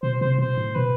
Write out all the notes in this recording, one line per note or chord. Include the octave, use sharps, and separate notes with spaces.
B2 C5
C3 C5
B2 C5
A2
B2 B4